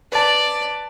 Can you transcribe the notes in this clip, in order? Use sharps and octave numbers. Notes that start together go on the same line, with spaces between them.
B4 D5 A5